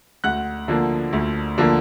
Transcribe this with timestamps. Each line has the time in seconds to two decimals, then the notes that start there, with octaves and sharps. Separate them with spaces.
0.24 D2 F#5 F#6
0.68 D3 F3 A#3
1.13 D2
1.58 D3 F3 A#3